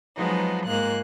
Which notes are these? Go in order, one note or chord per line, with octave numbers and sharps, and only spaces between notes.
F3 F#3 G#3 B3 D#4
G#2 G#3 A#3 F4 F#6